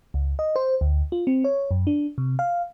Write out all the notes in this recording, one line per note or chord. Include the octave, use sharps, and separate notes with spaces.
C#2
D#5
C5
D2
F4
C4
C#5
F#2
D4
C3
F5